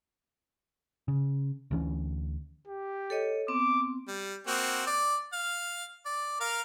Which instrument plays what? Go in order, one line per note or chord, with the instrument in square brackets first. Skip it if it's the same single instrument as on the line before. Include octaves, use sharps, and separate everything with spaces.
[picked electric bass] C#3
D2 E3 C#4
[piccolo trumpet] G4
[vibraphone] A4 C#5 D#5
[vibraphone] B3 C4 [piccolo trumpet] D6
[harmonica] G3
A#3 C4 F#4
D5
F5
D5
A#4 F5